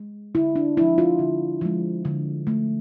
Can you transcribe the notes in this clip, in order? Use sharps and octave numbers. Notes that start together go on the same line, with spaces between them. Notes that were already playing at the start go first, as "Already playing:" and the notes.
Already playing: G#3
D3 E4
D4
F3 G#3 E4
F4
D3
F3 G#3
D3
A3